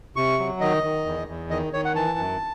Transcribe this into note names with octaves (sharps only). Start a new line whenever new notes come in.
C3 C#6
F#3
D#3 D#5
D#3
E2
E2
D#3 D#5
D#3 C#5
F#5
E3 A5
F#2